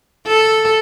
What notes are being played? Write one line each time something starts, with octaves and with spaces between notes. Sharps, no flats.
A4